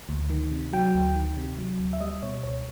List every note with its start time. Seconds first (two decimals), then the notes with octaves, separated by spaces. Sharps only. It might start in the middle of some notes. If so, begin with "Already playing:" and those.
0.09 D2
0.30 D#3
0.52 C3
0.73 F#3 G5
0.95 D2
1.15 D#3
1.37 C3
1.58 F#3
1.79 D2
1.93 E5
2.01 G3 D#5
2.23 B2 C#5
2.43 C#2 C#5